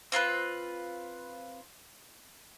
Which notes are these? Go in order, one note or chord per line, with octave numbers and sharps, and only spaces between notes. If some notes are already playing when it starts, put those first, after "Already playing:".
C4 F4 A4 B4